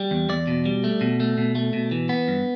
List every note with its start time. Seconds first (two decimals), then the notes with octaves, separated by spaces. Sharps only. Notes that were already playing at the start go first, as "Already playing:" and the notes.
Already playing: G3
0.11 E2
0.29 E2 D5
0.47 B2
0.66 G3
0.84 A3
1.01 B2
1.20 A3
1.38 B2
1.55 A3
1.73 B2
1.91 E3
2.09 B3
2.28 G2